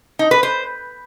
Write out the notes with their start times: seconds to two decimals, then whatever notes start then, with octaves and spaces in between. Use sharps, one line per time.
0.19 D#4
0.31 B4
0.43 C5